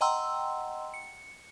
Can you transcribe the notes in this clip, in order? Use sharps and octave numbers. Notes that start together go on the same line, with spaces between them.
D#5 F#5 G5 A#5 C6 E6
C#7